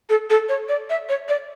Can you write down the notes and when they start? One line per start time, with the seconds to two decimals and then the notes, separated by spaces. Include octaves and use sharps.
0.09 A4
0.30 A4
0.49 C#5
0.69 D5
0.90 E5
1.09 C#5
1.28 D5